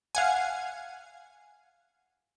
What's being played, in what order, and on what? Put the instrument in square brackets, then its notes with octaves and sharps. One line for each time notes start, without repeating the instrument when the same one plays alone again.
[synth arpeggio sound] F5 F#5 G#5